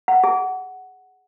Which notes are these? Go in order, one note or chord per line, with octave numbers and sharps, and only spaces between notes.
F#5
G#4